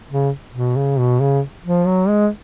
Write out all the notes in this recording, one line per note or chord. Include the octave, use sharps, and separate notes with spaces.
C#3
B2
C#3
B2
C#3
F3
F#3
G#3